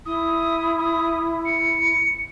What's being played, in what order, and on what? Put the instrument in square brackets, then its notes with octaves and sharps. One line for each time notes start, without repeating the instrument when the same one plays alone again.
[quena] E4 [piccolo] D#6
[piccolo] D#6
C#7